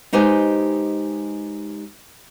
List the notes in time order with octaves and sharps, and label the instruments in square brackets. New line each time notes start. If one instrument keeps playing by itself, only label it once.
[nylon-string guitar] G#3 D#4 G4 B4 C5 G#5